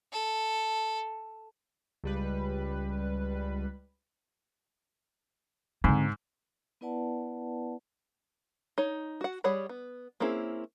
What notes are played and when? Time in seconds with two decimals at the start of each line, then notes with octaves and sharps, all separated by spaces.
0.13 A4
2.04 C#2 G3 B4
5.84 G#2 D3 C4
6.81 B3 E4 B4 D5 F#5 A5
8.78 D#4 C#5
9.21 F#4 F#5
9.44 G3 G#4 C#5 F#5 B5
9.69 B3
10.20 A#3 C4 C#4 E4 G#4